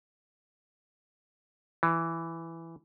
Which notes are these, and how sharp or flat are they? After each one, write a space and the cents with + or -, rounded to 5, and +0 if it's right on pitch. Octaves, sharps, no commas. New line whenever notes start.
E3 +5